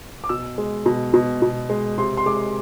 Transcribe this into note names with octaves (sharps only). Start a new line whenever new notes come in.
D6
B2 E6
G#3
B2
B2
B2
G#3
C3 C6
C6
G#3 D6